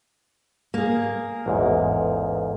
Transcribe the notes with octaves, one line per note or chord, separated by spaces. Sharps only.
A#3 G#4
A1 E2 G#2